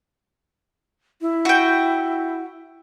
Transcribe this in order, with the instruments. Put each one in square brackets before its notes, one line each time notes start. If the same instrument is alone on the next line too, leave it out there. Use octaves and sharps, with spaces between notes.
[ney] E4
[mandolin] F#4 G5